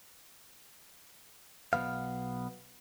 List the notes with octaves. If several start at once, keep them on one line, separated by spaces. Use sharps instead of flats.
B1 B2 D#3 B3 F5